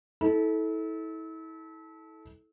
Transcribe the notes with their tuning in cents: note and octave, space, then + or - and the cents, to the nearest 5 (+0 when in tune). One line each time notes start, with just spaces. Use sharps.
E4 -35 A4 -15